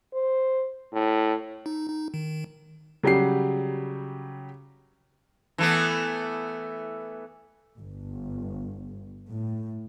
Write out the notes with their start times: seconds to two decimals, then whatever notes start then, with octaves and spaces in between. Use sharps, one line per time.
0.14 C5
0.93 A2
1.66 D#4
1.89 D#4
2.14 D#3
3.03 C#3 F#3 G3 G4 C7
5.58 E3 A3 B3
7.77 G1
9.30 A2